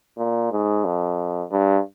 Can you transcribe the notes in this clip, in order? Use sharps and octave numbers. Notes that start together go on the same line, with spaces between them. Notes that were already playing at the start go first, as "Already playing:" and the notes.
A#2
G#2
F2
G2